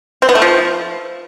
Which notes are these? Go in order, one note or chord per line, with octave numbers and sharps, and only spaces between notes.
C4
B3
A3
F3